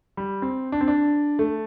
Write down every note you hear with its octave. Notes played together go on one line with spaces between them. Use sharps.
G3
C4
D4
C4
D4
A3